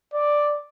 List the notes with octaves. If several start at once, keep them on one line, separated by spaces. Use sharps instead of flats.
D5